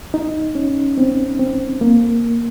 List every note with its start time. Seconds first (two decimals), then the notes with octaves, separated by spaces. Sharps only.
0.14 D#4
0.55 C#4
0.98 C4
1.39 C4
1.81 A#3